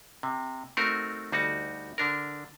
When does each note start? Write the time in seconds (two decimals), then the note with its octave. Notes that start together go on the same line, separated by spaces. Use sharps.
0.23 C3
0.77 A3 C4 D#4 F#4 A#4
1.32 D2 G3 D#4 F#4
1.98 D3 D4 A#4